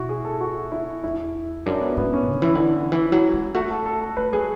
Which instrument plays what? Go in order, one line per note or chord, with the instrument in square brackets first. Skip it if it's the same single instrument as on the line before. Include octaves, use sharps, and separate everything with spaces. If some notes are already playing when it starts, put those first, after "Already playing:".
Already playing: [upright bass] B2 [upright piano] E4 F#4
[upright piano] G#4
A4
F#4
E4
[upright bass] E2 [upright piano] E4
[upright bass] F#2 [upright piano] D4
[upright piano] B3
[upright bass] G#2 [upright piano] B3
[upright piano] C#4
[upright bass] D3
E3
D3
E3
F#3
G#3
[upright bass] A3 [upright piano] F#4
[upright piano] A4
A4
A4
[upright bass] A3 [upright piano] B4
[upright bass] F#3 [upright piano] G#4